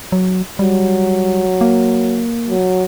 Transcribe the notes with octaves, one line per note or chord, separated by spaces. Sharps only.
F#3
F#3 G3
A#3
F#3